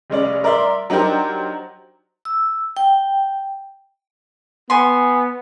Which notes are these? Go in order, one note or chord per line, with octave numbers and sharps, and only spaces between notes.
F1 G#3 C#4 D5
A#4 D5 E5 C6
F#3 D4 D#4 G4 A#4 C5
E6
G5
B3 G#5 C6